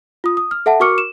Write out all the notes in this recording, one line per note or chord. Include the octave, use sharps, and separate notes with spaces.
F4 D#6
D#6
F6
A4 E5 F#5 A5
F#4 A#4 C#6 D6 F6 C#7
E7